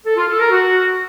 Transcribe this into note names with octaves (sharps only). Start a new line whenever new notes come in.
A4
F4
A4
A#4
F#4